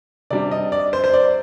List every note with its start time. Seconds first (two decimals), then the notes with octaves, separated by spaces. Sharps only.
0.31 C3 G3 D4 D5
0.51 D#5
0.72 D5
0.93 C5
1.04 C5
1.14 D5